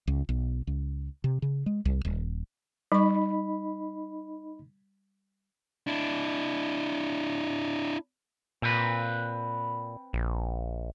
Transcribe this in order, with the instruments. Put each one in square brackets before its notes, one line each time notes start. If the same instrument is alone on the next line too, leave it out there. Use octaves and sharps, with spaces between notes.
[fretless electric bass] C#2
B1
C#2
C3
C#3
G#3
C2
D#1
[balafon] G3 C#6 [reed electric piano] D#4 D#5 B5
[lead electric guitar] D4 E4
[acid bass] A#2 [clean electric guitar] C4 B4
[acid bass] A#1